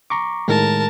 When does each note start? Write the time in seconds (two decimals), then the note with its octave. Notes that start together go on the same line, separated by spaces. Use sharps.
0.10 A#5 C#6 D6
0.48 A2 D#3 G#3 A#4 A5